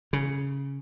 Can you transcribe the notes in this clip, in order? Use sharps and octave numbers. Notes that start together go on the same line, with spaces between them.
C#3